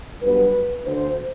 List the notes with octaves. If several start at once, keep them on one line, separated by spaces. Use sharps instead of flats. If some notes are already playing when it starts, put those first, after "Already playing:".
G2 F#3 B3 B4
D2 D3 A3 C5